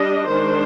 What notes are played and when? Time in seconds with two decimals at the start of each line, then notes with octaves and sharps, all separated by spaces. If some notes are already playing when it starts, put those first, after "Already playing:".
Already playing: G3 D4 D#5
0.29 D#3 G#3 D4 C5